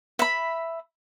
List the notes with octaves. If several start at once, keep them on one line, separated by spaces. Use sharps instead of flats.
E5 B5